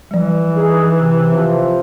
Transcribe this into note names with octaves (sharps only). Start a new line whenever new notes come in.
E3 F3 G3
D#4 G#4
C3
C3 F3